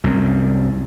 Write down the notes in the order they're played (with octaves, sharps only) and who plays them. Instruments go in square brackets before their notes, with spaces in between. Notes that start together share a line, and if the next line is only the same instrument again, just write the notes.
[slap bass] C2 F#2